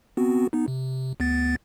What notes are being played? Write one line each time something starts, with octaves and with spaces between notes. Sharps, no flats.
B3 C4 F#4
B3 D#4
C3
D2 B3 A6